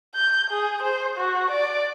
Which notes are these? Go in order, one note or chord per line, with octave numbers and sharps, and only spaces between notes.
G6
G#4
C5
F#4
D5